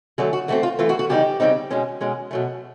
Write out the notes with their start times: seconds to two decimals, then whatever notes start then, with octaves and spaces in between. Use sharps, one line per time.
0.18 D3 F#3 A3 G#4
0.33 F#4
0.48 E3 A3 C4 F#4
0.63 F4
0.79 E3 A3 C4 F4
0.89 F#4
0.99 F#4
1.09 C#3 E3 G3 C4 D#4 G4
1.40 C#3 E3 G3 C4 D#4
1.70 B2 G#3 C#4
2.01 B2 G#3 C#4
2.31 B2 F#3 A3